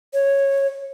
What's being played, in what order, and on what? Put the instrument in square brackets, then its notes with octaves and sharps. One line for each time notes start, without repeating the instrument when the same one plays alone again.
[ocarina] C#5